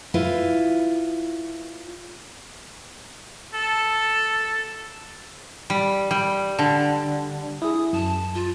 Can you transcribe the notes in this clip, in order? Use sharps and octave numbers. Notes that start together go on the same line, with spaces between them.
E4 F4 B4
A4
G3
G3
D3
E4 G#4 D#6
F#2 A5
F4